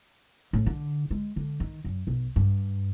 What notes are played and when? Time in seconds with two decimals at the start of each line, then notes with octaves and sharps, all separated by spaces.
0.53 A2
0.66 D3
1.11 G#3
1.36 D3
1.60 D#3
1.84 F#2
2.07 B1
2.36 G2